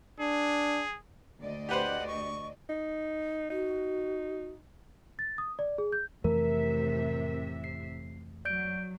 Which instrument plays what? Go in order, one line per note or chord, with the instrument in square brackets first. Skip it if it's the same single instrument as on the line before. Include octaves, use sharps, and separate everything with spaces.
[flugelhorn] D4 [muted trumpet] G#4
[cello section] D2 D5 D#5
[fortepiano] G4 B4 C5 [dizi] F#5
[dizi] C#6
[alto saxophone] D#4
[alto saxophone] D#4 [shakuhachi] F#4
[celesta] A6
D#6
D5
G#4
G6
[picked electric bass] F2 E3 A3 [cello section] A2 C3 E5 [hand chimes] A#4
[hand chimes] C7
[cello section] F#3 [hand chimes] D5 G6 D7